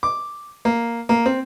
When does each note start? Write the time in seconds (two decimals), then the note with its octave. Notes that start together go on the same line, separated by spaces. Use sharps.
0.03 D6
0.65 A#3
1.09 A#3
1.26 C4